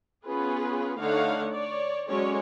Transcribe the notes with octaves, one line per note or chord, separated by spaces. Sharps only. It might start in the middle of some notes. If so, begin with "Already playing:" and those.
B3 C#4 F4 G#4 B4
D3 A3 D#4 C#5 F5 F#5
C#5 D5
F#3 G#3 C#4 A4 C#5 D5